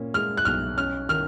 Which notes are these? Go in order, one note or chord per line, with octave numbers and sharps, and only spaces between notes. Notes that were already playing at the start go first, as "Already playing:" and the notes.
Already playing: A#2 C#4
G#3 F6
F#6
B1 F6
C#4 F6
D#3 F6